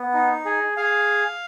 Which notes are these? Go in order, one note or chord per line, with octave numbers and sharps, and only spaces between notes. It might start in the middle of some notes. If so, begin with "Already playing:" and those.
Already playing: B3
D#4
G#4
G#4 F5